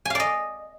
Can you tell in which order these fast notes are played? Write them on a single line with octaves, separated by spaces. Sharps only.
G#5 F5 D5 D#5